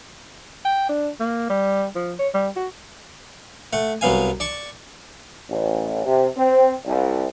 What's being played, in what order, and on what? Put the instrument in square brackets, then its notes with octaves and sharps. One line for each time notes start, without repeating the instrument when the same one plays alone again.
[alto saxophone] G5
D4
A#3
G3
F3
C#5
G3
F#4
[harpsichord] A3 F#5
C2 F#3 B3 F5 G#5
D5 A5 C#6
[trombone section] A1
C3
C4
C2